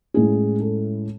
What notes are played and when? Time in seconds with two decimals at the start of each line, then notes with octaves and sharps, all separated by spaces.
0.14 A2 G#3 C#4 E4 G#4
0.60 A4